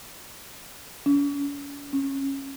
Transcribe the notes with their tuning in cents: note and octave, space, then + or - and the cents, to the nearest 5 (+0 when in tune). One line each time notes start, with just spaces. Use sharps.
C#4 +40
C#4 -20